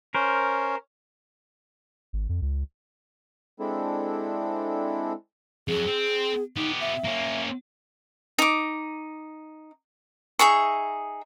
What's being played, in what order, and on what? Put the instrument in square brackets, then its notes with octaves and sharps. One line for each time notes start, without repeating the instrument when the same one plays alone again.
[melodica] C#4 [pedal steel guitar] A#4 C5
[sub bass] G#1
F2
C#2
[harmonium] G#3 C4 D4 E4 A4
[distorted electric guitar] F2 F#3 [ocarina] G#4
[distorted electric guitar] C4
[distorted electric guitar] B3 G4 [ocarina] D#4
[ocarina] E5
[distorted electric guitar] A#3 C#4
[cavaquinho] D#4 D6
D#4 G#4 E5 C#6